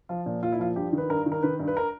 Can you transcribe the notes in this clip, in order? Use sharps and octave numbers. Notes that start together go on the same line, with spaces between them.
F3 F4
A#2
A#2 F4
E4
F3 F4
G2 G4
D#3 B4
G2 A#4
D#3
A#4
D#3 B4
G2
B4
A#4